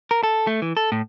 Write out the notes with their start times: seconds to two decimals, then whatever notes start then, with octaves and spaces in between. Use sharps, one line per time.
0.11 A#4
0.23 A4
0.47 A3
0.62 E3
0.77 A4
0.92 A2